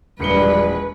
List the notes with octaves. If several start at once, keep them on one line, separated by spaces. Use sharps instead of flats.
E1 A#1 G3 B4 C#7 G7